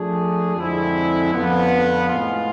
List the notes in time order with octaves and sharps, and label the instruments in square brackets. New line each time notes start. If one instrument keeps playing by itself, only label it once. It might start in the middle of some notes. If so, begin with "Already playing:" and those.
Already playing: [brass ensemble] F3 A3 D4 G#4
F2 D3 G#3 C4 E4
F2 D3 F3 B3
A2 G#3 B3 F4